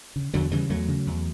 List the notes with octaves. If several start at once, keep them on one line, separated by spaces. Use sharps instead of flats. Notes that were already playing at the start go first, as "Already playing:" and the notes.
C#3
E2 D3 F#3
C#3 E3 G3
E2 F#3 A3
C#3
E2